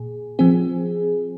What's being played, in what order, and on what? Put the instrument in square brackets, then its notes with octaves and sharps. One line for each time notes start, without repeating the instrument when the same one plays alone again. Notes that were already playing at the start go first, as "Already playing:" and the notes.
Already playing: [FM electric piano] A#2 G#4
F3 C4 G#4